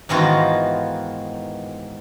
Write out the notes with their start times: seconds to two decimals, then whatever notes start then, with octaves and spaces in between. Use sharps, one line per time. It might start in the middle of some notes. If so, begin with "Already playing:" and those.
0.09 G#2 D#3 E3 B3 F4 F#4